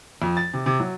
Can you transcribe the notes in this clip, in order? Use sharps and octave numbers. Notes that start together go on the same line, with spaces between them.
F2
A6
C3
C3
F#3